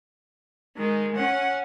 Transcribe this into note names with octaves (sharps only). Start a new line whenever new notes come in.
D#3 G#3
C#4 F#5